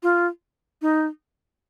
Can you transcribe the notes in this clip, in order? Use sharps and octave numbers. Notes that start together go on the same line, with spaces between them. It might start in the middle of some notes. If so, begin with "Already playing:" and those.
F4
D#4